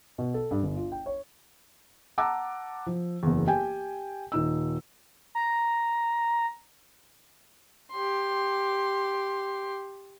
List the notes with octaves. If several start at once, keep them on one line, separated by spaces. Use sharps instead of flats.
B2
A4
G2
G1
F4
G5
C#5
F#5 A5 A#5 D6 E6
F3
F#1 E2
G4 G5 G#5
D#1 D#4 E6
A#5
G4 C6